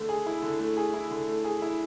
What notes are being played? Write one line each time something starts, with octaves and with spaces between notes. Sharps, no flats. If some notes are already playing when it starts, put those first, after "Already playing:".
Already playing: D3 A3
G#4
E4
D3
A3
G#4
E4
D3
A3
G#4
E4